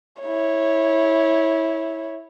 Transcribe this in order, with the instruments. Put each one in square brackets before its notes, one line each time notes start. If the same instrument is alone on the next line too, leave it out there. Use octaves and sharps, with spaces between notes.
[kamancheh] E4 C#5